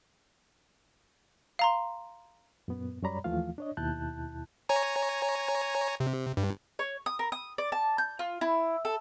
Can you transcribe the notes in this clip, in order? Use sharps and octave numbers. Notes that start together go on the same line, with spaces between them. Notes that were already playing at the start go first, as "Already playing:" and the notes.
F5 A#5 C6
F#2 A#2 B3
F#2 G3 C#5 D5 A#5 B5
D#2 E3 F3 A3 F4 F5
D4 C#5 D#5
D#2 B2 E4 A5 F#6 G6
C#5 G#5 A#5
C3
G2
C#5
D#6
A#4
D#6
D5
A5
G6
F4
E4
A4